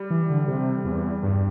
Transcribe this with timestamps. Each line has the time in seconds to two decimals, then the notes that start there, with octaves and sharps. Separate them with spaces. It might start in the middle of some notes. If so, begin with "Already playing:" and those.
Already playing: G3
0.10 E3
0.30 D3
0.47 C3
0.85 E2
1.23 G2